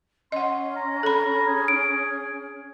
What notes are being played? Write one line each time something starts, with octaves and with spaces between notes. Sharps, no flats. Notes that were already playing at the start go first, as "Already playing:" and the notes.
C#4 D#5 F#5 C6
A#5
A4 B5
G#4
D7